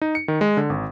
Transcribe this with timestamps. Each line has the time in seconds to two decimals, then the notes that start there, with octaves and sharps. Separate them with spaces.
0.02 D#4
0.15 C#7
0.28 D#3
0.41 G#3
0.57 D3
0.70 G#1